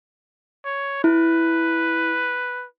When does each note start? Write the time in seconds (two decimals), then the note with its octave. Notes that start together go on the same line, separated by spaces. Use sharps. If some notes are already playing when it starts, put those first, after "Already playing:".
0.65 C#5
1.04 E4 B4